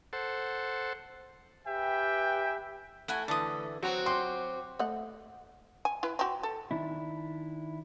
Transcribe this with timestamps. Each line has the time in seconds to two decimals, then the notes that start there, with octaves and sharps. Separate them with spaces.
0.13 A4 C5 F#5
1.67 G4 B4 E5 G5 G#5
3.08 A3 E4 F#5 G#5
3.28 D3 E3 A5 D#6
3.83 F#3 C4 F#4 C5 A#5
4.06 G4 C6
4.79 A3 D#5 F#5
5.85 G#5
6.03 E4 B4
6.19 C4 F#4
6.43 A4
6.71 D#3 D4 E4